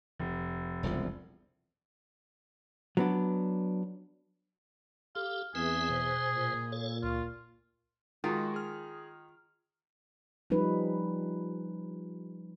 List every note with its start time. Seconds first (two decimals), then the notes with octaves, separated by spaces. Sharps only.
0.19 F1
0.83 E1 C2 F3
2.97 F#3 B3 D4
5.15 G4 A4 F5
5.55 E2 C4 G#4 B4 E5
5.90 B2 C5
6.33 A#2
6.72 A4 C#5
7.03 C#2 F4
8.24 D#3 G#3 F4 F#4
8.54 G#4 F6
10.50 F3 G3 C#4 D#4 B4